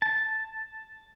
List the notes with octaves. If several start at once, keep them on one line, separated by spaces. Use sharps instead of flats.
A5